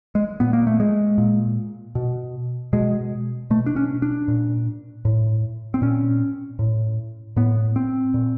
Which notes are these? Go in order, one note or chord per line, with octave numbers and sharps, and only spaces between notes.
G#3
A#2 B3
A#3
A3
G#3
A#2
B2
B2 G#3
B2 A3
D4
C#4
D4
A#2
A2
C4
A#2 C#4
A2
A2 B3
C4
A#2